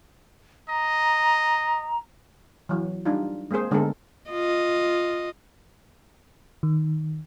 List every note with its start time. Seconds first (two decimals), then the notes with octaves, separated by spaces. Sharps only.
0.68 D#5 A#5
2.69 E3 F#3
3.05 G3 D4 D#4 F4
3.51 G#3 A#3 C4 G#4 C5
3.71 D3 G#3 A3 B3 A4 A#4
4.30 F4 D#5
6.63 D#3